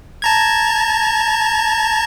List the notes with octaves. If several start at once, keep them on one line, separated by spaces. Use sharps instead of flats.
A5 A#5 G#6